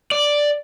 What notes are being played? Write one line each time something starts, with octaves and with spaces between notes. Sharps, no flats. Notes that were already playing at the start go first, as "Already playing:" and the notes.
D5